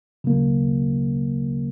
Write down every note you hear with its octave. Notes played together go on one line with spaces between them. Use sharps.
C#3 F#3 A#3